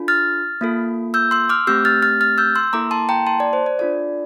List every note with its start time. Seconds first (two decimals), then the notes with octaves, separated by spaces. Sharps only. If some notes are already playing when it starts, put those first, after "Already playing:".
Already playing: D4 F4 A4
0.08 F6 A6
0.61 A#3 F4 A4
1.14 E6 G6
1.31 C6 E6
1.49 D6 F6
1.67 A3 C4 G4 E6 G6
1.85 F6 A6
2.03 F6 A6
2.21 F6 A6
2.38 E6 G6
2.56 C6 E6
2.73 A#3 E4 A4 A#5 D6
2.91 A5 C6
3.09 G5 A#5
3.27 A5 C6
3.40 D5
3.53 C5
3.66 D5
3.79 D4 F4 A4 D5